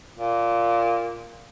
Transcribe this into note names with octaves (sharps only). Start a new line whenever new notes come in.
A#2